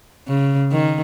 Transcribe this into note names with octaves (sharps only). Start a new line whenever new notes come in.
C#3
D#3